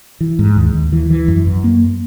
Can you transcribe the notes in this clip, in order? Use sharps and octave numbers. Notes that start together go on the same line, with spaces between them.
E3
G#2
D#2
D#2
E3
E3
F#2
F#2
A#3